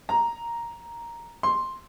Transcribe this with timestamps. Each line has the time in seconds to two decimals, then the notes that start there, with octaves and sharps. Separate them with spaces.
0.09 A#5
1.43 C6